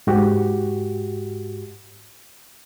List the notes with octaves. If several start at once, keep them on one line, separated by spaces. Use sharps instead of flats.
G#2 F#4 G4